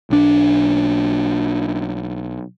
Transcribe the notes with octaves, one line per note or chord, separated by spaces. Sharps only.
B1 D4